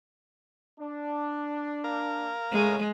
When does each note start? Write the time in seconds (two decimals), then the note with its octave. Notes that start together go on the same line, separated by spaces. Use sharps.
0.80 D4
1.84 A#4 F5
2.52 A2 C#3 G#3